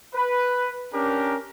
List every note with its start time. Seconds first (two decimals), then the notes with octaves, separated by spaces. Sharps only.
0.15 B4
0.94 C#4 D4 G4 A#4